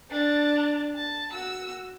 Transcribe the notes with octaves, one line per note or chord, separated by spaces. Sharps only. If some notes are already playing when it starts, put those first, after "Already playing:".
D4 A5
A5
F#4 E6